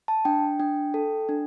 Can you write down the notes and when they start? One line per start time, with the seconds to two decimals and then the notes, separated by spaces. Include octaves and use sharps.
0.08 A5
0.25 D4 G5
0.60 D4 G5
0.94 A4
1.29 D4